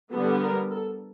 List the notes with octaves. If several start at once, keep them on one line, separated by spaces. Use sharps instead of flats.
D3 G3 B3 A4
A#4
A4